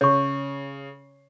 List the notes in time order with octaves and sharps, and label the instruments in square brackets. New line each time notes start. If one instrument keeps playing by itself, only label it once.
[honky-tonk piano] C#3 [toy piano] C#5 C#6